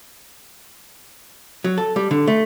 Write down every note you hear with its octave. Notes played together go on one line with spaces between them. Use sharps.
F#3
A4
G3
D3
A3